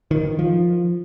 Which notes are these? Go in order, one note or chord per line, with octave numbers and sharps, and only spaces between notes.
D#3
F3